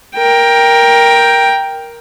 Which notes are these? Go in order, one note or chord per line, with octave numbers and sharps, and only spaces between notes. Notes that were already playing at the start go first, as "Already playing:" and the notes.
A#4 G5